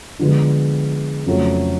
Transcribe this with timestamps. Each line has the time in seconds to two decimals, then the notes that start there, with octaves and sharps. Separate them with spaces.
0.19 D3 F3 G#3 B3
1.26 F2 C#3 F#3 A3